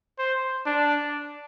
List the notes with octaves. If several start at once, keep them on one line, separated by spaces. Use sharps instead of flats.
C5
D4